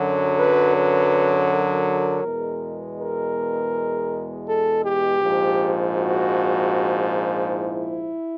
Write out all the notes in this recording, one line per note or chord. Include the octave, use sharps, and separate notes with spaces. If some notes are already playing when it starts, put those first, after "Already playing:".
Already playing: F#2 D3 F#3
B4
B4
A#4
E2 B2 G#3
A#4
A4
G4
A#1 G#2 F3
F#4
E4